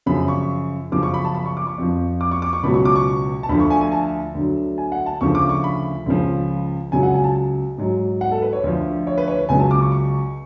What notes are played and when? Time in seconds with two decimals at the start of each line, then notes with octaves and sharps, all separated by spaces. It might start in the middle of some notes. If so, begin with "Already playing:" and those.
0.06 F#2 C#3 F3 B5
0.28 C#6
0.92 F#2 C#3 F3 D6
1.03 C#6
1.14 B5
1.25 A5
1.35 B5
1.46 C#6
1.57 D6
1.67 C#6
1.78 F2 F3
2.21 D6
2.31 C#6
2.42 D6
2.53 C#6
2.63 C#2 B2 F#3 B5
2.74 C#6
2.85 D6
2.96 C#6
3.43 A5
3.49 D2 D3 F3 B5
3.60 C#6
3.70 G#5
3.81 G#5
3.92 A5
4.35 D2 D3 F#3
4.78 G#5
4.92 F#5
5.06 A5
5.21 D2 C#3 F3 C#6
5.35 D6
5.49 C#6
5.64 B5
6.06 C#2 C#3 F3
6.92 C#2 C#3 F#3 G#5
7.03 F#5
7.14 G#5
7.24 A5
7.78 G#2 F#3
8.21 F#5
8.31 A4
8.42 B4
8.53 C#5
8.64 D2 D3 F3
9.07 C#5
9.18 B4
9.28 C#5
9.38 B4
9.49 C#2 C#3 F#3 G#5
9.60 A5
9.71 D6
9.81 C#6
9.92 C#6